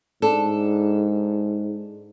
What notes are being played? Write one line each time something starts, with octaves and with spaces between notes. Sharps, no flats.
G#2 D4 A4